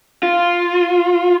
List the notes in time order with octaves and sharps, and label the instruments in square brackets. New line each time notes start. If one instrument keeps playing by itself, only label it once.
[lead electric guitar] F4